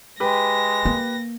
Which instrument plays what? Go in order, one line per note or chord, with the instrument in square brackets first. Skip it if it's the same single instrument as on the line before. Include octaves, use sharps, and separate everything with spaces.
[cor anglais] G#3 [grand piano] G4 B4 [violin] A#6
[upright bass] A#3